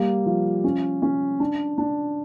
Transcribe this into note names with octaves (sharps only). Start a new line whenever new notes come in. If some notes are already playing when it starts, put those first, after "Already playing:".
Already playing: G3 A#3
F3
C#4
C#4
D4
D4